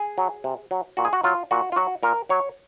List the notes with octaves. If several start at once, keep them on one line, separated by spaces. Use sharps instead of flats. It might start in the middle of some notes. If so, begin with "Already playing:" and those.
Already playing: G#4
F#3
C3
F#3
A#2 F#4
G#4
F#4
F#3 F4
A#2 F#4
F4
F#3 F#4
A#2 A#4
F#3 C#5